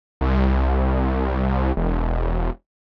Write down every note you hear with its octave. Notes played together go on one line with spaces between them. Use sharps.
C2
E1